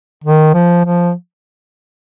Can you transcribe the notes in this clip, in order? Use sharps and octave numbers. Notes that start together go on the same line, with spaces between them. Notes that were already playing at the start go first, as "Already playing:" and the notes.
D#3
F3
F3